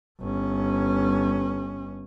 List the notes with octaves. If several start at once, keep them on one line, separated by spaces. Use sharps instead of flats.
G1 C#4